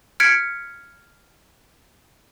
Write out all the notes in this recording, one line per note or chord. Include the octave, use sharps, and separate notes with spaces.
F6 G#6 B6 C#7 D7